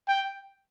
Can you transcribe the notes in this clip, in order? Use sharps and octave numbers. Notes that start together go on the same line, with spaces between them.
G5